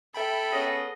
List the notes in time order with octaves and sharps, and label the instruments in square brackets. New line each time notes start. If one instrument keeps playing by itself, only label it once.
[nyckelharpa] A4 [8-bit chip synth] E5 G5 B5
[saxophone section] B3 C#4 G#4 [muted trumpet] D#5